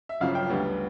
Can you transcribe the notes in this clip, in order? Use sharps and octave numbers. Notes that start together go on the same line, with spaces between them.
E5
G1 F#2 C#3 F3 F5
G5
D2 D3 G3 B3